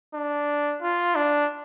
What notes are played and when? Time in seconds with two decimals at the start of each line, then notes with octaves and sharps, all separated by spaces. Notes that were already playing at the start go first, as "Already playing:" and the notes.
0.14 D4
0.82 F4
1.16 D4